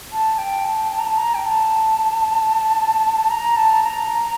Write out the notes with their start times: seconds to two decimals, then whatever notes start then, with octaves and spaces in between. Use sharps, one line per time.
0.12 A5
0.38 G5
0.65 A5
0.92 A5
0.99 A#5
1.06 A5
1.18 A#5
1.34 G5
1.45 A5
3.30 A#5
3.57 A5
3.83 A#5